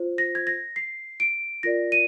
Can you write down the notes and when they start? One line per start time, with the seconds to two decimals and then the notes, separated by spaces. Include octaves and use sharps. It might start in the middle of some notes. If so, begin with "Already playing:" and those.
Already playing: F4 C5
0.18 A#6
0.35 G#6
0.47 A#6
0.76 C7
1.20 D7
1.63 F4 A#4 D5 A#6
1.92 D#7